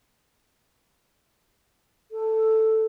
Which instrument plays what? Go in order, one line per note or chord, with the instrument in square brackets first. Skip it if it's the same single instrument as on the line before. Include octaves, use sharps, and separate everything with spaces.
[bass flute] A4